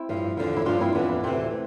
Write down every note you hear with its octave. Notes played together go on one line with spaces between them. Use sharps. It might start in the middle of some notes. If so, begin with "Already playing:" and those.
Already playing: C4 E4
G2 F3
E2 D3 F3
E4
G2 F3 D4 F4
C4 E4
F2 E3 B3 D4
D2 C3 E3 A3 C4